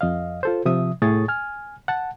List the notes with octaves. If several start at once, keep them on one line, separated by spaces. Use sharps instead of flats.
F2 D#5 F5
F4 A4 C5
C3 F3 E5 D#6
C2 A2 G#4 C#6 D#6 A6
G#5 F6
F#5 A5